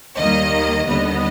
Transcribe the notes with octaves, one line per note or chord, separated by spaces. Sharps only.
D#2 D#3 G3 A#3 D#5
D#2 D3 G3 B3 D#5